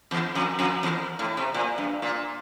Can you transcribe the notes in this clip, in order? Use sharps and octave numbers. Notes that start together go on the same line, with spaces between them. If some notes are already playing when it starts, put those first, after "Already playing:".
E2
F2
F2
E2
A2
C3
A#2
G2
A#2